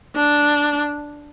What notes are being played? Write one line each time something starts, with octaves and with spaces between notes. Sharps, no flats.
D4